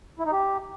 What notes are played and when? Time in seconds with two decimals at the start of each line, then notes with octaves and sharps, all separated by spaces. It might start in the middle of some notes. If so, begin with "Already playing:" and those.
0.19 E4
0.26 D#4
0.32 G4